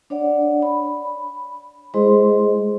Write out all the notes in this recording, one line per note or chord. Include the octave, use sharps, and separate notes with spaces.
D4 C#5 D5 F#5
B5
G#3 E4 G#4 C5 D#5 C6